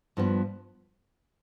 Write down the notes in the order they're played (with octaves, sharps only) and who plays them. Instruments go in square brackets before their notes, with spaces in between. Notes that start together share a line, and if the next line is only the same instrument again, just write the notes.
[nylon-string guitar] G2 F3 B3